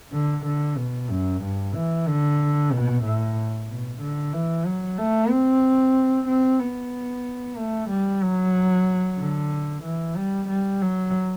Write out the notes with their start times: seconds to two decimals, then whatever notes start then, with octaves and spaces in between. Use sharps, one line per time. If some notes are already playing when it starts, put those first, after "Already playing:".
0.12 D3
0.45 D3
0.77 B2
1.10 F#2
1.42 G2
1.74 E3
2.07 D3
2.72 B2
3.04 A2
3.69 B2
4.01 D3
4.33 E3
4.65 F#3
4.98 A3
5.31 C4
6.28 C4
6.60 B3
7.57 A3
7.89 G3
8.23 F#3
9.19 D3
9.84 E3
10.17 G3
10.49 G3
10.82 F#3